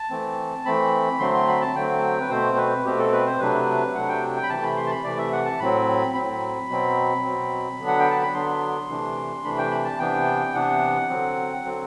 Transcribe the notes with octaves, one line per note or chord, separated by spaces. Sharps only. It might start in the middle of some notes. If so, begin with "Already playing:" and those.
Already playing: A5
E3 A3 C4
E3 A3 C4 B5
D3 F#3 A3 C4 C6
C6
B5
A5
D3 F#3 A3 C4 G5
B4
B2 A3 C4 C5
B4
B2 A3 C4 G4
A4
B4
C5
C3 F#3 A3 D4 B4
C3 F#3 A3 D4 F#5
G5
G5
B5
C3 E3 A3 A5
B5
C6
A5
B5
C3 E3 A3 D5
E5
F#5
A5
A2 F#3 C4 B5
A2 F#3 C4 B5
B2 F#3 C4
B2 F#3 C4
D3 F#3 B3 D4
F#5
G5
A5
B5
D3 F#3 B3 D4 C6
C3 E3 A3 D4
C3 E3 A3 D4 B5
G5
B5
A5
C3 E3 B3 D4 G5
C3 E3 B3 D4 F#5
D3 F#3 C4
D3 F#3 C4